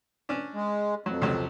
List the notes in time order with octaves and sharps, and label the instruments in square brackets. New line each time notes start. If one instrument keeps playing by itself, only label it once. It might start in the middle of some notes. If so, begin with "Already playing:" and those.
[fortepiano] C#4 D4
[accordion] G#3
[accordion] F2 [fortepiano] F#3
[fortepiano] C#2 C3 F#3